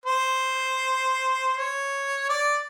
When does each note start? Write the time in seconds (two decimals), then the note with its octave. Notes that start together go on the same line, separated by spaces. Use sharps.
0.06 C5
1.55 C#5
2.29 D5